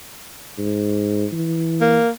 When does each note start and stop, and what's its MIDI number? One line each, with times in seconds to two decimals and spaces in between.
0.58 1.25 44
1.33 1.99 52
1.81 2.10 58